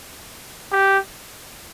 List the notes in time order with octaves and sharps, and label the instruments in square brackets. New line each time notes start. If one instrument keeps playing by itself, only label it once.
[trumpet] G4